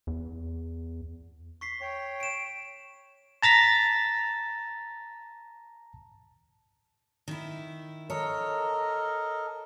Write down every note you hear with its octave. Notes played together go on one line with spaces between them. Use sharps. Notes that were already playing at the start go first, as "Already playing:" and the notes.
E2
C#6 B6 C7
C#5 G5
D7 E7
A5 A#5 A6 B6
D#3 E4
A4 A#4 C#5 D#5